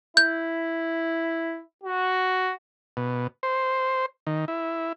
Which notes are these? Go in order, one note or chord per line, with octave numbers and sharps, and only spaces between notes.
E4 G6
F#4
B2
C5
D#3
E4